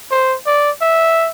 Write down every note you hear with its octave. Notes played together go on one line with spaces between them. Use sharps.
C5
D5
E5